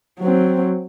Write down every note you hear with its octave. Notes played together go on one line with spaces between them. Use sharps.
F#3 C4